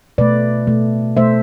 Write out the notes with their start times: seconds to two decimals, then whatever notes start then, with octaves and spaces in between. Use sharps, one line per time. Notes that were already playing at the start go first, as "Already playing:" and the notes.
0.18 B2 A3 B4 D5
0.67 B2 A3
1.16 B2 A3 C5 E5